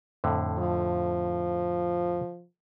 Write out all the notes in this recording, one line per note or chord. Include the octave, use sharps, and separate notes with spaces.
F2 A2 D3
F3